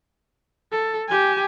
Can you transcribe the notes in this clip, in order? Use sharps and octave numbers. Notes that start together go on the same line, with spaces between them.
A4
G4 G#5